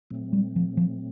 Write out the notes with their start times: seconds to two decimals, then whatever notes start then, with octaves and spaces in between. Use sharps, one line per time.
0.10 A#2 F#3 A3 C4
0.33 G3
0.56 F3
0.77 F3